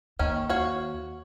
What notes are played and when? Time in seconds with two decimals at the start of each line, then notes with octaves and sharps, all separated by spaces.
0.19 D#2 D#3 C#4
0.49 F#4 C#5 F5